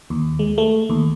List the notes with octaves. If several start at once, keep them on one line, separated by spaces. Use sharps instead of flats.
D#2
G#3
A3
D#2